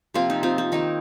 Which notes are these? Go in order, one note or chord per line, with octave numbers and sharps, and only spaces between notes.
C3 F3 A#3 C4 F4
D#4
C4 F4
C4
D#3 A#3 D#4